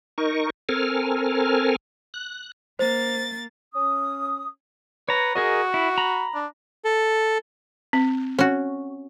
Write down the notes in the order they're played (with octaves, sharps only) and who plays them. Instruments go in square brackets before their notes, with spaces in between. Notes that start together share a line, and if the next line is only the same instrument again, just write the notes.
[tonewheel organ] D#4 A#4 C#6
C4 A4 A#4 G#5 F6
F#6
[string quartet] A#3 A6 [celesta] C5
[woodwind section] C#4 D#6
[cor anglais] B4 [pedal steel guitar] C#5 A#5
[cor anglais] F#4 [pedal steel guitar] G#4 A#4 D#5
[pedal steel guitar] E4
A#5 B5
[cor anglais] D4
[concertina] A4
[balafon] C4
[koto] C#4 F#4